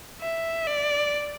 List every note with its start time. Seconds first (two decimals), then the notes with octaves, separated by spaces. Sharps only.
0.21 E5
0.67 D5